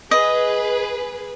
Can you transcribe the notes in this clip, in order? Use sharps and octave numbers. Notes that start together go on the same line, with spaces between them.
G#4 B4 D#5